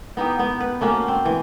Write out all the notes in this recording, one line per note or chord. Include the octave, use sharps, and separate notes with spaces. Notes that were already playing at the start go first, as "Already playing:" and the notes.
B3 D#4 E4 G4
B3
B4
A3 A#3 C#4 F#4
C4
E3